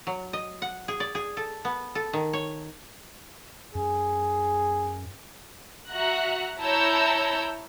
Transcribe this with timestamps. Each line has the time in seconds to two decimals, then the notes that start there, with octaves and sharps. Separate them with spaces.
0.07 F#3
0.33 D#5
0.62 F#5
0.88 G#4
1.00 D5
1.15 G#4
1.37 A4
1.65 B3
1.95 A4
2.13 D#3
2.33 C#5
3.75 F#2 G#4
5.89 F#4 E5 A#5 F#6
6.60 E4 C#5 A5 A#5 E6 G6